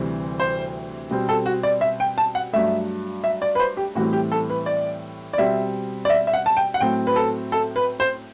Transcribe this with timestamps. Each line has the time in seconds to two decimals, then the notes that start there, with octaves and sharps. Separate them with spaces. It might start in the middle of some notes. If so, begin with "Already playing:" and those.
Already playing: D2 C3 E3 G3 C4
0.40 C5
1.10 B2 G3 C4
1.29 A4
1.46 F#4
1.63 D5
1.81 E5
2.00 G5
2.18 A5
2.35 F#5
2.53 G2 F#3 A3 E5
3.24 E5
3.42 D5
3.55 B4
3.59 C5
3.77 G4
3.95 A2 E3 G3 C4 F#4
4.13 G4
4.32 A4
4.50 B4
4.66 D5
5.33 D5
5.37 B2 G3 C4 E5
6.05 D5
6.10 E5
6.27 E5
6.33 F#5
6.46 A5
6.57 G5
6.74 F#5
6.80 A2 F#3 C4 G5
7.07 B4
7.16 A4
7.52 A4
7.76 B4
8.00 C5